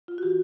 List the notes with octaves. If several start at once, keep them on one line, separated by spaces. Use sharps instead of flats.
F4
F#4
E3 G4